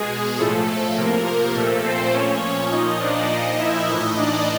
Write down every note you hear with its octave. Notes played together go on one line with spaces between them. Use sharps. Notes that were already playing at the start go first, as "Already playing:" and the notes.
Already playing: B2 G#3 G#4
A2 F3 A3 A4
C3 F3 A#3 A#4
A#3 A#4
A#2 F3 A3 A4
C4 C5
A#2 F3 C#4 C#5
A#2 F3 D#4 D#5
D4 D5
A#2 F3 D#4 D#5
E4 E5
A2 E3 D#4 D#5
D4 D5